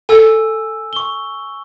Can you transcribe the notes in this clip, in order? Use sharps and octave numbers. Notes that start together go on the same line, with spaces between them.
A4 G#5 E6
C#6 G7